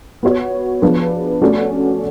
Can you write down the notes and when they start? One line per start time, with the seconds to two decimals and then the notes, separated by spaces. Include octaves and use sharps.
0.23 B3 F#4 C#5
0.82 F3 B3 D4 G#4 B4
1.42 A3 C#4 F#4 A4 D5